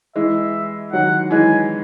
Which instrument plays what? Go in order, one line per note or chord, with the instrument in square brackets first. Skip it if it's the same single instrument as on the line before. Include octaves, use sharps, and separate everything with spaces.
[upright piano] E3 G#3 [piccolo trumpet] E5
[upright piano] D#3 F#3 [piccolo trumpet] F#5
[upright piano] E3 G#3 [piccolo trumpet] G#5